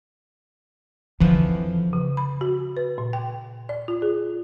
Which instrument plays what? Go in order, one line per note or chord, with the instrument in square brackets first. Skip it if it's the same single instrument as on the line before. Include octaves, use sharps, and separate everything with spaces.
[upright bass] F2 F3 [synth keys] D3 E3
[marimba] C#3
B5
F#4
B4
A#2
G5
D5
F4
G#4